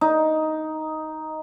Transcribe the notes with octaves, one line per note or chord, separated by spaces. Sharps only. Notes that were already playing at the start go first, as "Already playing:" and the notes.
D#4